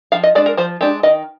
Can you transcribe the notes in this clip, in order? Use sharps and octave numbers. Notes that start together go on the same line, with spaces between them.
F3 F5
D#5
G#3 D4 D5
A#4
F3 C5
G#3 D4 G4
D#3 D#5